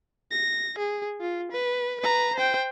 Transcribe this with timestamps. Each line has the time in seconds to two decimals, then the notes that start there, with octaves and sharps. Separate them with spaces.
0.32 A#6
0.79 G#4
1.21 F4
1.52 B4
2.01 B4 A#5
2.36 C5 G5